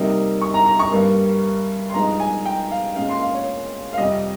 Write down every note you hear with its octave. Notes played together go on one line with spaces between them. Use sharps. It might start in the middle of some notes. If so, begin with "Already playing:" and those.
Already playing: C3 G3 A#3 D#4
C#6
A#5
A#5
C#6
G2 G3 A#3
C6
G2 F3 G#3 D#4 A#5
G#5
G5
F5
A#2 G#3 C#4 F5
C6
F5
C#5
F5
F2 C3 G3 D#5